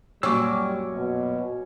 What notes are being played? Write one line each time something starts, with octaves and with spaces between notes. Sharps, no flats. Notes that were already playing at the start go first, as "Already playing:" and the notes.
F#2 A#2 F#3 G3 C#4 D6 E6
B2